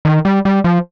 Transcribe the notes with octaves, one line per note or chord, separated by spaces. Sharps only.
D#3
G3
G3
F3